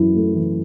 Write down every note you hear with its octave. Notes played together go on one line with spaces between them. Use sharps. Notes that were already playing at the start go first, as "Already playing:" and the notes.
Already playing: F#2 E3 E4
A3
E3